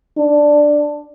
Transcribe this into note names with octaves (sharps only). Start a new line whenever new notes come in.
D4